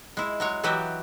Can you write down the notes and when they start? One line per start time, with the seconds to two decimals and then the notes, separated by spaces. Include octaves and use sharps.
0.17 G#3 E4
0.40 F#3 G#3 C#5
0.63 E3 F#3 E4 F#4 G4 D#5